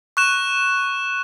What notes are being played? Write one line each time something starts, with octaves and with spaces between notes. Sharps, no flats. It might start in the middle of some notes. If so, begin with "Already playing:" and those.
C#6 F#6 E7